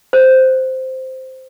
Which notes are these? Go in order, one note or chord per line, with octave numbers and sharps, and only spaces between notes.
C5